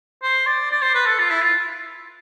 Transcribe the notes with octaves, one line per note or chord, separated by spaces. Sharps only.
C5
D5
D5
C5
B4
A4
F4
E4
F4